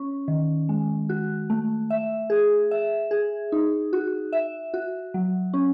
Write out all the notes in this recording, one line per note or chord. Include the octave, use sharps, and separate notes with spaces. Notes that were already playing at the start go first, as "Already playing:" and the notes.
Already playing: C#4
D#3
G#3
F#4
A3
E5
G#4
E5
G#4
D#4
F#4
E5
F#4
F#3
C#4